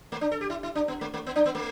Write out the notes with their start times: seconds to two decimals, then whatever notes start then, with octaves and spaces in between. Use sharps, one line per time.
0.12 A3
0.21 D4
0.31 A4
0.41 G4
0.50 E4
0.63 E4
0.75 D4
0.88 B3
1.01 A3
1.14 A3
1.26 B3
1.36 D4
1.46 B3
1.55 A3